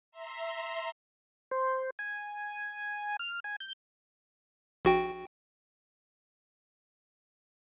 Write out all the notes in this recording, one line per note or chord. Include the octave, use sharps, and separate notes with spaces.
E5 A#5 C6
C5
G#5
F6
G#5
G6
A#1 F#4 G5